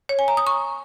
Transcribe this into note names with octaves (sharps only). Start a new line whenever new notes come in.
C#5
G#5
A#5
D#6
C#6